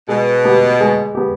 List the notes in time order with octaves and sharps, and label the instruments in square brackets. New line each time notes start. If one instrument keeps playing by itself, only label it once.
[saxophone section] B2 [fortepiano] G#3
[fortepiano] B3 G4
G#3
B3 G4